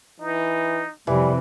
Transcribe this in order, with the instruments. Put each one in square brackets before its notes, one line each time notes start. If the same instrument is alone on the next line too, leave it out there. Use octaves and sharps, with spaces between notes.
[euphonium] E3 [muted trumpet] D#4
[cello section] F2 C3 [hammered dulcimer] E3 [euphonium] G3